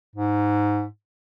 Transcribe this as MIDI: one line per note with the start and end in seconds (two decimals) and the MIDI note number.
0.16 0.84 44